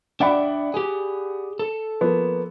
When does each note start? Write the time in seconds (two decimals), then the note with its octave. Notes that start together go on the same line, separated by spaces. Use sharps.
0.20 D4 D5 E5 F#5 G5 B5
0.74 G4 G#4
1.59 A4
2.01 F3 A#3 B3